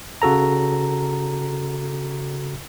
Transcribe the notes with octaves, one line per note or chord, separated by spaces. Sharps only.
C#3 F#4 A4 A#5